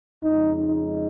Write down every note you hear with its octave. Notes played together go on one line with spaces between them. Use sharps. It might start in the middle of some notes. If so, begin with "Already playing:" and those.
F2 C#3 G#3 D#4
D#4